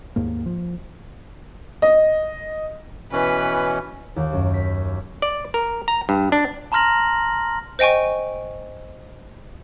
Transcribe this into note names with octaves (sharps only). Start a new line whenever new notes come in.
D#2 G#2 A#3
F3
D#5
B2 E3 C#4 B4
D#2
F#2
B6
D5
A#4
A#5
G2
D4
A5 A#5 C6 F6 A#6 F#7
C5 D#5 G5 G#5 C#6